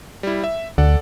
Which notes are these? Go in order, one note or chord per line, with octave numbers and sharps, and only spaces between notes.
G3 E4
E5
D2 A4 D5 F#5